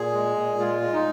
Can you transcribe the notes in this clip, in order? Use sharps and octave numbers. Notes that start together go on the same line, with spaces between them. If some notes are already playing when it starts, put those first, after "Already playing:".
Already playing: A#2 G#4
G#3
A#2
G#3 F4
G#3
D#4